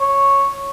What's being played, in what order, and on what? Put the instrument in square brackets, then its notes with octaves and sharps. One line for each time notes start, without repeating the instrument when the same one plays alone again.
[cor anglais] C#5